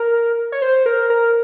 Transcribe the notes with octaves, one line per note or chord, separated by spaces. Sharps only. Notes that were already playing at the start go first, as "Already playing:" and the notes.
Already playing: A#4
C#5
C5
A#4
A#4